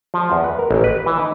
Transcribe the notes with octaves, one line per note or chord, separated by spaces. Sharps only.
F3
E2
B4
A#4
A1
B4
E3
D#4